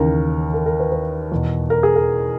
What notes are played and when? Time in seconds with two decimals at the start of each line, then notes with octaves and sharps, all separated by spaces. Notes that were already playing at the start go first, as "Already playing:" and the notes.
Already playing: D#2 C#3 E3 A#4
0.54 A#4
0.66 A#4
0.80 B4
0.92 B4
1.32 E2 B2
1.70 A#4
1.83 G#4
1.96 A#4